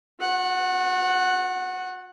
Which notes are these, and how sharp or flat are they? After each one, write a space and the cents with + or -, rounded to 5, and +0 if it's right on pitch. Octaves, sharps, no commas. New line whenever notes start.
F#4 -40 F#5 +0